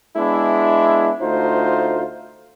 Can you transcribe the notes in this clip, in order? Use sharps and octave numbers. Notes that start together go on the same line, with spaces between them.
G#3 B3 D4 E4
D2 A3 D#4 F4 C5